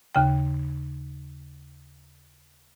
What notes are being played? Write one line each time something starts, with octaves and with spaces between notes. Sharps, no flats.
D#2 C#3 G5